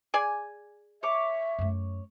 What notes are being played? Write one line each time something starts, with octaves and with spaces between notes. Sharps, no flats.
G#4 D5 G#5
C#5 E5 D6
F#2 A3